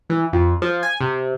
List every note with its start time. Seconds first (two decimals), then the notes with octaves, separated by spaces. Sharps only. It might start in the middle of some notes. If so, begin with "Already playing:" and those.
0.10 E3
0.33 F2
0.62 F3
0.83 G#5
1.00 C3